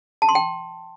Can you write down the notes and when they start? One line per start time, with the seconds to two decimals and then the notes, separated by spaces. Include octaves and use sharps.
0.22 A5
0.29 C6
0.35 G5